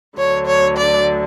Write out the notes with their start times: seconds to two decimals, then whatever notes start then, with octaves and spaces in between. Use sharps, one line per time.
0.17 D2 D3 F#3 C#5
0.47 C#5
0.77 D5